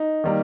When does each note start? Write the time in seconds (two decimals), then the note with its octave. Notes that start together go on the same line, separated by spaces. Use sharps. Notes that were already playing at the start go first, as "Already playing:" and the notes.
Already playing: D#4
0.24 D#3 G3 A#3